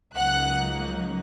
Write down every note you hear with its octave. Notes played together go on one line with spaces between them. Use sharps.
C#2 C#3 F#3 A#3 D#4 F#5 F#6